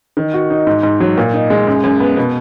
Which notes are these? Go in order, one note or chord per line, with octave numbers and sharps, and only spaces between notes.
D#3
F#4
D#4
G#2
G#2
F#3
A#2
D#4
G#3
F#2
F#2
B3
B2